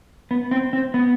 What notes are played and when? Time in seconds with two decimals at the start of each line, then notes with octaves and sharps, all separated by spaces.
0.31 B3
0.51 C4
0.73 C4
0.94 B3